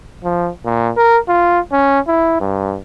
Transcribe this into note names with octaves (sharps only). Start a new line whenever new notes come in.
F3
A#2
A#4
F4
C#4
E4
G2